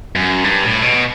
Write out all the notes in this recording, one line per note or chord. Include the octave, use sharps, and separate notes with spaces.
F#2
G2
A2
B2